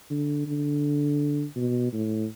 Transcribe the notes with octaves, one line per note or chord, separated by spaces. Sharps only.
D3
D3
B2
A2